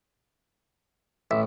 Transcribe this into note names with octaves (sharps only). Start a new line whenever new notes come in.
A1 E5